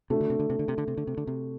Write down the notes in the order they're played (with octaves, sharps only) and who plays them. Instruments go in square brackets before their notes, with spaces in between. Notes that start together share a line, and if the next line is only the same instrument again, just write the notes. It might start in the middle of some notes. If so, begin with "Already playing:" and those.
[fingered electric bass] C3 [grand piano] A3 D4 F#4
[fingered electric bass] D3
C3
D3
C3
D3
C3
D3
C3
D3
C3
D3
C3